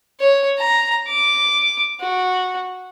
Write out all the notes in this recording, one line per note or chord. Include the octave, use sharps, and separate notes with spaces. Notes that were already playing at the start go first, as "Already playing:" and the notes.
C#5
A#5
D6
F#4